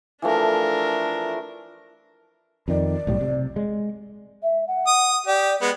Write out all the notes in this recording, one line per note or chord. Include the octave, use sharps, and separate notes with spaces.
E3 F3 A3 D4 A#4
F2 D#3 D5
B1 A2 G3
C3
G#3
E5
F#5
D#6
G4 D5
G#3 B3